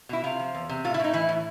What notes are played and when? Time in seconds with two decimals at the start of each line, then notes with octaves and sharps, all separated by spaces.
0.09 B2 E4
0.24 C3 F4
0.40 F3
0.55 E2
0.69 C3
0.84 A2 F4
0.94 E4
0.99 A2 D#4
1.13 E3 E4
1.29 A2